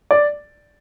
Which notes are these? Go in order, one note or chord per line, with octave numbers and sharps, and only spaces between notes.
D5